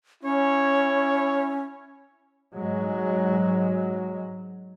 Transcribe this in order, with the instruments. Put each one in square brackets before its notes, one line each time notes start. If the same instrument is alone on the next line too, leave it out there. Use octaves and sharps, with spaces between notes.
[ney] C#4 [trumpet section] E4 C#5
[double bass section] G#2 F#3 G#3